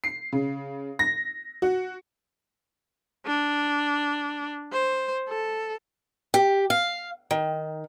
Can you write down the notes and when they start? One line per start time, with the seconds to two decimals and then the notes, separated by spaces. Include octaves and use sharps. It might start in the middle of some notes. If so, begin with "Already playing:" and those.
0.04 C7
0.32 C#3
0.99 A#6
1.62 F#4
3.26 D4
4.73 C5
5.29 A4
6.34 G4
6.70 F5
7.31 D#3